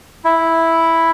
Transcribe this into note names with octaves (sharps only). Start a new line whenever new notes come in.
E4